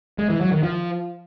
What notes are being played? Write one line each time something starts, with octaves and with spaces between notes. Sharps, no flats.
G#3
E3
F#3
D#3
F3